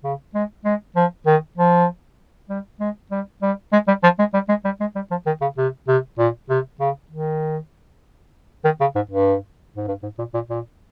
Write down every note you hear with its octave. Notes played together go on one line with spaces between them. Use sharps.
C#3
G#3
G#3
F3
D#3
F3
G3
G#3
G3
G3
G#3
G3
F3
G#3
G3
G#3
G3
G#3
G3
F3
D#3
C#3
C3
C3
A#2
C3
C#3
D#3
D#3
C#3
G#2
G2
G#2
G2
G#2
A#2
A#2
A#2